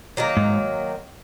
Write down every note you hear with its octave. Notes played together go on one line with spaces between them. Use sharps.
D#3 F#3 A#3
G#2